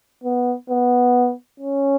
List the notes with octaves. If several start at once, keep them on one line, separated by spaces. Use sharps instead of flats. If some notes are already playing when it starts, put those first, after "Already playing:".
B3
B3
C#4